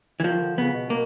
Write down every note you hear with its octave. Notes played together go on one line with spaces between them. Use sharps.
E3
D#3 F3
D3
C#3 B3
B2
A#3